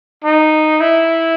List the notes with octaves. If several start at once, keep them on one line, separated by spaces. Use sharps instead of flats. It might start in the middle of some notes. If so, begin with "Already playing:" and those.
D#4
E4